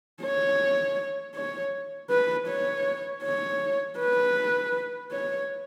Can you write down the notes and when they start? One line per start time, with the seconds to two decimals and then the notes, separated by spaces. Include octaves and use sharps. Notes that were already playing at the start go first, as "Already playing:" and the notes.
0.22 C#5
1.35 C#5
2.11 B4
2.48 C#5
3.24 C#5
3.99 B4
5.12 C#5